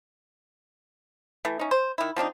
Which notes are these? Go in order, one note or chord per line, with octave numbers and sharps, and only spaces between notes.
E3 A3
C#4 D#4
C5
D#3 E4
F3 C4 D4 D#4